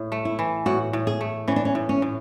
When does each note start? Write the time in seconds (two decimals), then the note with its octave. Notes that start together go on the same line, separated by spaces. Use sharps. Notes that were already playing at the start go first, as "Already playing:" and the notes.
Already playing: A2
0.12 A3
0.25 E4
0.39 E3
0.66 A2 F#4
0.93 A2
1.07 G#4
1.21 A3
1.48 E3 C#4
1.56 D4
1.65 C#4
1.75 A2
1.89 C#4
2.02 A2